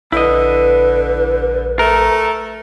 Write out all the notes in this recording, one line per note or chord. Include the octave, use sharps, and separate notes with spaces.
A#1 D3 E4 B4 D#5
A3 A#4